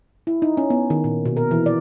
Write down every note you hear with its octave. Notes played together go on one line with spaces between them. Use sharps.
E4
D#4
C#4
B3
D#3
A#2
B2
A#4
E3
D5